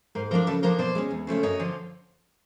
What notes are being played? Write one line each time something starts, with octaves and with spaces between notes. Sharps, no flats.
G#2 A#4 C5
F3 A#3 D4 A#4 C5
C#3 A4 B4
F3 A#3 D4 A#4 C5
B2 C5 D5
G#3 C#4
E2
C#3 F3 A3 C#4
F#2 C#5 D#5
D3 F3